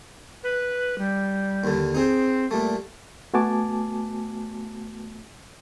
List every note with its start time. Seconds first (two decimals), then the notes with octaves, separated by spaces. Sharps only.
0.43 B4
0.98 G3
1.64 D#2 D3
1.95 C4 D#4 G#4
2.51 A#2 G3 A3
3.34 A3 B3 F#4 G#5 A5 D6